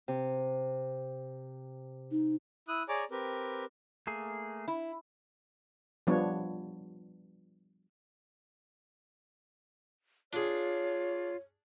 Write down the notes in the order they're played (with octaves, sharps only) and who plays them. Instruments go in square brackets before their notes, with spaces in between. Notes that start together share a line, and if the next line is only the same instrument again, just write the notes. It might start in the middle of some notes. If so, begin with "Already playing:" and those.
[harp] C3
[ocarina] D#4
[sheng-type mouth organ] E4 D#6 F#6
G#4 C#5 D5 G#5 A#5 D6
C4 G4 A#4 B4
[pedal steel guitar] A3 A#3 G#4
[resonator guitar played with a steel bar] E4
[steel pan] F3 G3 B3 D4 C#5
[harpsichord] D4 G#4 [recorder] F4 [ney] C#5